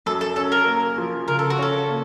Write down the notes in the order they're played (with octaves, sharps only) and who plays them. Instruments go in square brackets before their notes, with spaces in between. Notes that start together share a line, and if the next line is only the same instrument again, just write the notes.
[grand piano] F#2 [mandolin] A4
[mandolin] A4
[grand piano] C#4 [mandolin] A4
[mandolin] A#4
[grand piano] A#3
F3
[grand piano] C#3 [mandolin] A#4
[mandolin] A4
F#4
[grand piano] C#4 [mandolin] A4
[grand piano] A#3